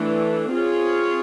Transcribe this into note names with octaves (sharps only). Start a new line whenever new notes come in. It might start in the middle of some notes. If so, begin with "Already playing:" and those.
Already playing: E3 A3 D4
C4 F4 G#4 C#5